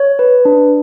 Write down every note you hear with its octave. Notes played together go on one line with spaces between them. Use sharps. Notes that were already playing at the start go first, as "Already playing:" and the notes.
Already playing: C#5
B4
D4